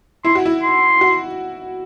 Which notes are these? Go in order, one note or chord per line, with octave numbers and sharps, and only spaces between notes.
E4 C6
F#4
E4
C6
F#4